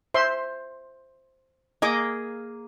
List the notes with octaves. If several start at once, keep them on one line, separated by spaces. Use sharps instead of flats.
C5 E5 C6
A#3 G#4 D#5 D6